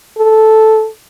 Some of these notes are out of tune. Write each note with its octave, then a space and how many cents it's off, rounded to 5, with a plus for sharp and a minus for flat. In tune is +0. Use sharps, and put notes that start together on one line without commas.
A4 -5